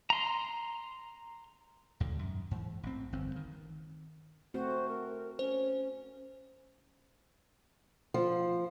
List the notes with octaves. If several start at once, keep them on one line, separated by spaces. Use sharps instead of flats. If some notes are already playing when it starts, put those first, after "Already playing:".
A#5 C6
D#2 G#2 B2 D3
F#2
G#2 E3
A1 C4
G1 F2 C4
D#3
A3 C4 F#4 C5
A#4
C#4 C5
F3